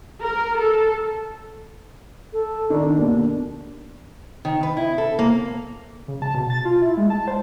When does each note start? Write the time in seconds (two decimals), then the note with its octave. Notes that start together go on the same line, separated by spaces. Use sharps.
0.21 A#4
0.59 A4
2.33 A4
2.70 D#3 D4
2.83 D#4
2.95 D#2 B2 D4
4.45 D#3
4.63 B4
4.77 E4
4.98 A4
5.19 A#3
6.08 C#3
6.22 A5
6.35 B2
6.50 A6
6.65 F4
6.82 E4
6.97 G#3
7.10 A5
7.28 C5